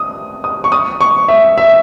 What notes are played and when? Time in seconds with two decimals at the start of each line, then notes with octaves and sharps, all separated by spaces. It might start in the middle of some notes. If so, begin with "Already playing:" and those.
Already playing: D#6
0.44 D#6
0.64 C#6
0.72 D#6
1.01 C#6
1.28 E5
1.58 E5